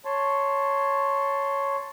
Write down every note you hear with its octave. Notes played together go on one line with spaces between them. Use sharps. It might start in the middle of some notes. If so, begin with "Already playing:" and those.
C#5 A5 C6